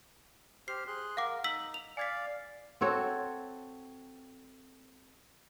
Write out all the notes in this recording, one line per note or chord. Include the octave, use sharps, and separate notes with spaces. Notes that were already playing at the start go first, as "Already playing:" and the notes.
G4 C5 F6 C7
G#4 C6 F#6
A#4 F5 F#5 D6
D#4 E6 B6 F#7
F7
D5 F5 G#5 G#6 B6
C4 F#4 A4 C#5